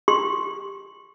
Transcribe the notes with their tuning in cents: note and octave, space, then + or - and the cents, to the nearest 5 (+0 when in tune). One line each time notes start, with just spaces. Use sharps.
G4 +15 C6 +0